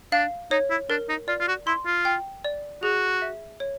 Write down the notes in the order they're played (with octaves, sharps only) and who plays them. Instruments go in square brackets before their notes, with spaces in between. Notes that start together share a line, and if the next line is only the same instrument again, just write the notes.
[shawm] D4 [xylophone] F5
[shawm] D#4 [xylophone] C#5
[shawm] E4
[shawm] D4 [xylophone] A#4
[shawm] D#4
[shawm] F4 [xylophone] D5
[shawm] F4
F#4
[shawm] E4 [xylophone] C6
[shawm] F4
[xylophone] G5
D5
[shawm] F#4 [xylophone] G#4
[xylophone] E5
C#5